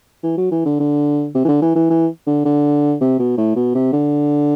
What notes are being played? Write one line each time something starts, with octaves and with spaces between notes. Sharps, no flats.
E3
F#3
E3
D3
D3
C3
E3
D3
E3
E3
E3
D3
D3
C3
B2
A2
B2
C3
D3